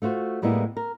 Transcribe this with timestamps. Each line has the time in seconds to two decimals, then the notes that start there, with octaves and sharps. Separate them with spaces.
0.02 A3 F4 F#4 C5
0.42 A2 G3 G#3 A#3 B3 E4
0.77 A#4